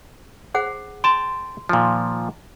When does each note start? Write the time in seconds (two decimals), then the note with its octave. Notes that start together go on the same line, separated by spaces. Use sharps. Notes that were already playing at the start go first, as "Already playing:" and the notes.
0.54 G#4 C5 F#5
1.04 G5 A5 C6
1.69 A#2 D#3 F3